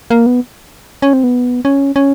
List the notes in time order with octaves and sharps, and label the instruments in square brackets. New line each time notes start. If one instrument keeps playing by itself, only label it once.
[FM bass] A#3
B3
C#4
C4
B3
C#4
C#4